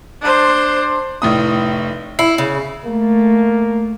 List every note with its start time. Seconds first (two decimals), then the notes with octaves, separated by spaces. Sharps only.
0.21 D4 C5
1.22 F1 A2 D#6
2.19 E4 C7
2.38 C#3
2.85 A3 A#3